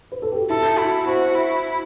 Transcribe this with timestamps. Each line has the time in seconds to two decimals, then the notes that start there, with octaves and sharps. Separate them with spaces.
0.12 B4
0.22 A4
0.32 G4
0.40 F#4
0.50 E4 A4
0.78 E4 F#4
1.06 F#4 C5
1.35 E4